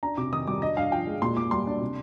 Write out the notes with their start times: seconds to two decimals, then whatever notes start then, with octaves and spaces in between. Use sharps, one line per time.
0.03 D4 A#5
0.17 C3 D6
0.33 D#3 D#6
0.47 G3 D6
0.62 D4 D#5
0.77 G2 F5
0.92 F3 G5
1.07 G#3
1.22 A#2 C6
1.37 A#2 D6
1.51 G3 C6
1.67 D4
1.81 C3